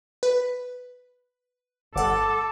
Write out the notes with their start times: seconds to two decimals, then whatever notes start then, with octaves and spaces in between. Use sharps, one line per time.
0.23 B4
1.96 G1 A4 F#5 D6